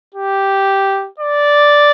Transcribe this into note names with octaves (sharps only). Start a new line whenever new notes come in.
G4
D5